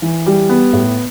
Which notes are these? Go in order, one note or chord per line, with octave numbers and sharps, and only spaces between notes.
E3
G3
B3
A2